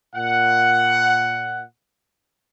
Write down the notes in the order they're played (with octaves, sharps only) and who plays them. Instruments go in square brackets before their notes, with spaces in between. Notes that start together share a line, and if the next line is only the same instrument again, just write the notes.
[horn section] A#2 F#5